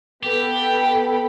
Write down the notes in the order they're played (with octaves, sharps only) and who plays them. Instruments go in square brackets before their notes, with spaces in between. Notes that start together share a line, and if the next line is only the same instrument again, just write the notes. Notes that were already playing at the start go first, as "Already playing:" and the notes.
[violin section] B3 A4 B5 [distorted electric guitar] G4 [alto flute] G5